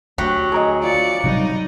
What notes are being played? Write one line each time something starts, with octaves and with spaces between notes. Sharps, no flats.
D2 F#3 G4
G#4 A#4 D#5
F4 D5 C#7
C3 F#3 G3 D#4